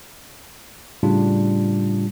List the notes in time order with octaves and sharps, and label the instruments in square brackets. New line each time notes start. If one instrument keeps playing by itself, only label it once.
[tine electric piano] A2 C#3 G3 D4 F4